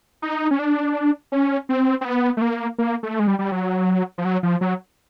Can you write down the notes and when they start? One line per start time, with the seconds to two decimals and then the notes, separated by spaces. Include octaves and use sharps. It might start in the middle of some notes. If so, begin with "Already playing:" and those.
0.22 D#4
0.51 C#4
0.59 D4
1.32 C#4
1.69 C4
2.01 C4
2.05 B3
2.37 A3
2.42 A#3
2.78 A#3
3.03 A3
3.20 G#3
3.27 G3
3.39 G3
3.52 F#3
4.18 F3
4.25 F#3
4.43 F3
4.61 F#3